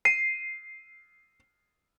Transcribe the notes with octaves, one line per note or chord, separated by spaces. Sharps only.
C7 D#7